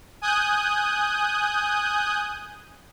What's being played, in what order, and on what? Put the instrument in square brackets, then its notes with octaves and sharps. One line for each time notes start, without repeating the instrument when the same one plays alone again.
[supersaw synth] G#5 D#6 F#6 G6